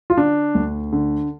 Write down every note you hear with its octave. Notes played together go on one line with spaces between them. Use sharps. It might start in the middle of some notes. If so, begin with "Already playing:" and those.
F4
D3 D4
D2
D3